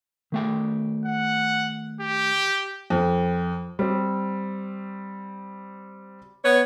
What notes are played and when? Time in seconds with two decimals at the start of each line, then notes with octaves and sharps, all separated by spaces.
0.32 D#3 A3 G5
1.05 F#5
2.01 G4
2.90 F2
3.79 G3 C4
6.45 B3 C#5